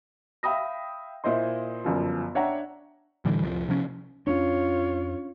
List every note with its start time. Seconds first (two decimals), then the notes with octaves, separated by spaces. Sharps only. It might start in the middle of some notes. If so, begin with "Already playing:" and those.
0.43 E5 F5 G5 B5 D#6 A#6
1.24 A#2 E4 C5 D#5 C6
1.84 G1 F#2 F3
2.35 D4 C#5 E5 F#5 G5 A#5
3.25 A2 D3 E3 G3
3.42 F1 C2 F3
3.69 C3 F3 C#4
4.27 F2 C#4 D4 F4 C#5